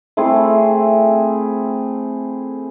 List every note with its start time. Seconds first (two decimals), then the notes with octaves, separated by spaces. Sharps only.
0.17 A3 C4 E4 G#4